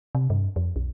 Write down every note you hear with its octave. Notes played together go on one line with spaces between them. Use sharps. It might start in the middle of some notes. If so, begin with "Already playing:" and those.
C3
G2
F2
B1